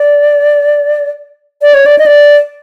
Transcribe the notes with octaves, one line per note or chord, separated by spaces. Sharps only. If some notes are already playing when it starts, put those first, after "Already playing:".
Already playing: D5
D5
C#5
D5
D#5
D5